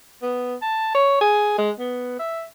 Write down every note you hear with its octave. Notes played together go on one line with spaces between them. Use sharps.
B3
A5
C#5
G#4
G#3
B3
E5